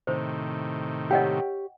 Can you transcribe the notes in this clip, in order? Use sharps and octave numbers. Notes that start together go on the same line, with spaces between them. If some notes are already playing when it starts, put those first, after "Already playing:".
A2 C3 D#3 C5
G4 C#5 D#5 F#5 G5